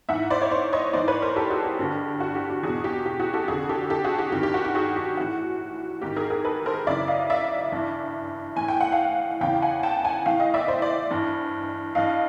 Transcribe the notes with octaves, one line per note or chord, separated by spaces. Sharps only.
G#2 E3 E5 F#5
C5 D5
C#5
C5 D5
C#5 D#5
G#2 E3 C5 D5
B4 C#5
A#4 C5
G4 A4
F#4 G#4
G4
G2 D3
F#4
G4
G4
E2 B2 F#4 G#4
G4
G4
F#4 G#4
G4 A4
F2 D3 F#4 G#4
G4 A4
G4 A4
F#4 G#4
G4
G2 D#3 G4
G4
F#4
G4
F#4 G#4
G4
A2 E3 F#4
G#2 D#3 G4
G#4 A#4
G#4 A#4
A4 B4
A#4 C5
F#2 C#3 E3 D5 E5
D#5 F5
D5 E5
G2 E3
A2 E3 G#5
G5
F#5
F5 G5
E2 C#3 E3 F5 G5
F#5 G#5
G5 A5
F#5 G#5
A2 E3 F5 G5
D#5 F5
D5 E5
C5 D5
C5 D5
G2 E3
G2 E3 D#5 F5